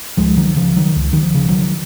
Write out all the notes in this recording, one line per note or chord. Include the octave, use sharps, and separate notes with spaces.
C#2 F3 G#3
D#3 F#3
C#3 F3
D#3 F#3
C#2
D#3
F3
C#3
D#3 F#3